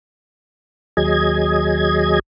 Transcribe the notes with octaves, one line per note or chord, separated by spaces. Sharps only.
D#2 F#3 G#4 D#5 G#6